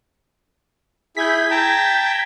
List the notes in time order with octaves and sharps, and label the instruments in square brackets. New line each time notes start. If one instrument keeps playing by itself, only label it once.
[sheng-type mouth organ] E4 G#4 [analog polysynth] G6 G#6 B6
[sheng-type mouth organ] G5 A5 A#5